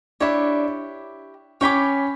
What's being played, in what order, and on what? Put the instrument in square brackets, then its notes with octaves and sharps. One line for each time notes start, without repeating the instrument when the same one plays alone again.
[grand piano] D4 [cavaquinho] E4 G4 C#5
[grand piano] C#4 [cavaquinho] C#5 G5 B5 D6